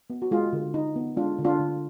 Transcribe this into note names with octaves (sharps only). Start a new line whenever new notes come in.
B3
F#4
G#3 F4 G#4
D3
D3 D#4
B3
G#3 D4 F4
D3
D4 F4
D3